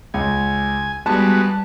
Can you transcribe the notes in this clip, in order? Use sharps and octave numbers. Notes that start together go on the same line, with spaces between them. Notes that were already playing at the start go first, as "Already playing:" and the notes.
C#2 G#5
G3 G#3 B3 F#4 A5